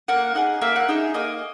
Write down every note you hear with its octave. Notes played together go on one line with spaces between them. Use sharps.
A#3 F#5
D#4 G#4 F#5
A#3 E5
F#5
D#4 G#4 E5
A#3 D#5